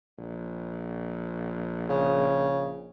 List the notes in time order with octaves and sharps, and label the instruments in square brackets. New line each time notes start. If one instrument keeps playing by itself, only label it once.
[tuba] A#1
[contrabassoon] C#3